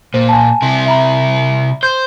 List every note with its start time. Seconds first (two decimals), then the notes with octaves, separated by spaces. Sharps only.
0.14 A#2 C5
0.29 G#5 A5
0.62 C3 E4
0.86 E5 A#5 B5
1.83 C5 G6